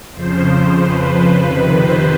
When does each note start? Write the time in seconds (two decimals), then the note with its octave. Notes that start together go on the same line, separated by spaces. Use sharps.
0.13 F2 C#3 F3 C5
0.46 C5
0.78 B4
1.09 B4
1.41 F2 C3 D#3 B4
1.73 C5